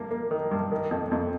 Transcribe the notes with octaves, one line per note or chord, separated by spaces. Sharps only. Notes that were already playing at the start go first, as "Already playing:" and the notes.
Already playing: G2 A#3
A#3
D#3
G2
D#3
F2
F2